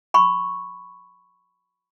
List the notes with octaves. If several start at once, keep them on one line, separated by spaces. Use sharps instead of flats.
B5 C#6